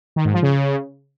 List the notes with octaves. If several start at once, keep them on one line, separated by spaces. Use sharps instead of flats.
D#3
G#2
F3
C#3